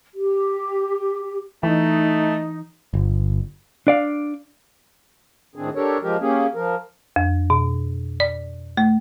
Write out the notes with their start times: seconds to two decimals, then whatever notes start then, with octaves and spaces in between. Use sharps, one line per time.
0.15 G4
1.63 E3 A3 D#4
2.94 G1
3.87 D4 D5 F5
5.56 A2 D#3 C4 D4 G#4
5.75 D4 G4 A4 A#4 C#5
6.02 F3 G#3 G4 A#4
6.20 A#3 C#4 G4 G#4
6.55 F3 A#4
7.16 F2
7.50 B2
8.20 D5
8.77 A3